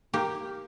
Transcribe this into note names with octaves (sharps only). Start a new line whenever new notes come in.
A#3 G4